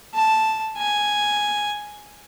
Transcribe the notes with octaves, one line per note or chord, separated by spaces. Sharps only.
A5
G#5